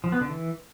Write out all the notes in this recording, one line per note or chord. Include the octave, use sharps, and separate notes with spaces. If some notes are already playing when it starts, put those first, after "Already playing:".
F3
B3
D3
E3